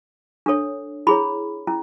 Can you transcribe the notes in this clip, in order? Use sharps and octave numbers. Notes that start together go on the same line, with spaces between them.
D4 A4 C#5
E4 G#4 C#5 B5
C#4 E4